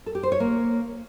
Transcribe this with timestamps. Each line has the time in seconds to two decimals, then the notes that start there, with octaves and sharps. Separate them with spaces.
0.06 A4
0.15 G4
0.23 C5
0.32 C#5
0.40 A#3